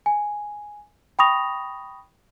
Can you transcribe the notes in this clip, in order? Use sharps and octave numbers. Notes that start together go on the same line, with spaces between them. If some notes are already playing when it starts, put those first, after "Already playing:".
G#5
G5 B5 C#6 D#6 A#6 F7